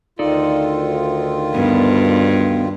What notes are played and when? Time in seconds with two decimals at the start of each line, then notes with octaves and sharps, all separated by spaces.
0.19 D2 D#3 D#4 F4 A4 D5
1.54 G2 B3